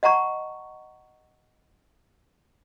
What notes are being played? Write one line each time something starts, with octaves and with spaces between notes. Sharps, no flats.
D#5 F#5 A5 A#5 C#6